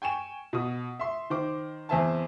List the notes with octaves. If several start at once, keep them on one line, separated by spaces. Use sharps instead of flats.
G5 G#5 C#6 E7
B2 D#6
E5 C6
D#3 C5 D6
E2 C4 C5 E5 G#5 A5